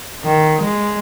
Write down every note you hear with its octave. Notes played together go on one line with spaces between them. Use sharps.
D#3
G#3